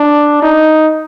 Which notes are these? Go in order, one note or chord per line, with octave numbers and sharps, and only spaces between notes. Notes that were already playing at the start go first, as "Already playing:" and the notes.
Already playing: D4
D#4